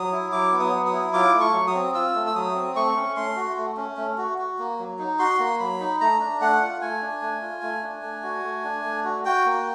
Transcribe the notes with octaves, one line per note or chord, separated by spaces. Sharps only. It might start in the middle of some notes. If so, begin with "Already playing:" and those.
Already playing: F#3 D#6
E4
F#3 D6
B3
D#6
F#3
D#6
E4
F4 D6
A3
C#6
F#3
D#6
C4
F4 E6
A3
E6
F#3 D#6
C4
A3 C#6
C#4
A3 C6
F#4
A3
C#4
A3
F#4
F#4
A#3
F#3
D#4
F#4 C6
A#3
F#3 B5
D#4
A3 A#5
D4
A3 F#5
F4
A3 G#5
D4
A3
F4
A3
D4
A3
F#4
A3
D4
A3
F#4
F#4 G5
A#3